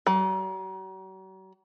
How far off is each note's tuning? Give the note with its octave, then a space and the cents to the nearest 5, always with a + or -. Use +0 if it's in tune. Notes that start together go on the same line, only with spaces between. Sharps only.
F#3 +45